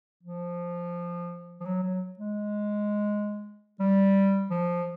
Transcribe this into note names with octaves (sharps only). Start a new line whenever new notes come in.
F3
F3
F#3
F#3
G#3
G3
F3